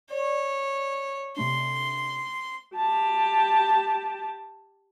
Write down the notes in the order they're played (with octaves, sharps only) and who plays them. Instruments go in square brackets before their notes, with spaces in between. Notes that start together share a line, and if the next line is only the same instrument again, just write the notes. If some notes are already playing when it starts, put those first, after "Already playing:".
[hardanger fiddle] C#5 [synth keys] D5
[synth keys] C3 A3 D4 [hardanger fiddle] C6
[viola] G4 A5